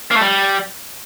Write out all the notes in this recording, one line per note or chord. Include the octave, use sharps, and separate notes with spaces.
A#3
A3
G3